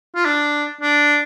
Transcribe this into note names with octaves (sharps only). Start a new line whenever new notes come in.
F4
D4
D4